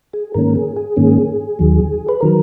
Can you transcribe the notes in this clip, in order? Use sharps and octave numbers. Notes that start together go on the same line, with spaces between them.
G#4
G#2 D#3 A#3 C#4 A#4
G#4
G#4
G#2 D#3 A#3 C#4
D#2 D#3 F#3
B4
D#3 F#3 A#4